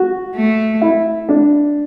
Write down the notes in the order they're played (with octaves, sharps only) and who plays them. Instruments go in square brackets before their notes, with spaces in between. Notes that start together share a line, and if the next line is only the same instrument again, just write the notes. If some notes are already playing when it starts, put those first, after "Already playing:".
Already playing: [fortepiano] F#4
[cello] A3
[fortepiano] E4
D4